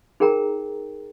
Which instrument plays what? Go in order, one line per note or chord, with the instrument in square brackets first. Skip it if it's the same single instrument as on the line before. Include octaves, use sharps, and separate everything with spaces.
[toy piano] D#4 G#4 A#4 G5 A#5